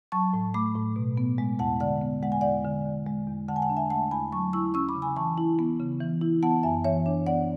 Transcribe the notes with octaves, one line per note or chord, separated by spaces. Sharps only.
F#3 A5 C#6
A2
A3 B5 D6
A2
B2
B3
G#3
E2 F#5 A5
D3 D5 F#5
B3
G#3 F#5
G#5
E2 D5 F#5
D3
E2
G#3
E2
D3 F#5 A5
G#5
F#5 A5
D4
E5 G#5
A3 F#5 A5
E2 G#5 B5
F#3 A5 C#6
E4 C#6 E6
C#4 C#6 E6
B5 D6
C#3
G#5 B5
E3 A5 C#6
E4
B3
C#3
E3
E4
B3 F#5 A5
F#2 E5 G#5
E3 C#5 E5
D4
B3 D5 F#5